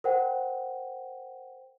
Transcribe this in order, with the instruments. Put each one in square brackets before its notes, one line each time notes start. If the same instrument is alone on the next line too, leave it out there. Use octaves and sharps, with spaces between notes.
[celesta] A#4 C5 F#5 G5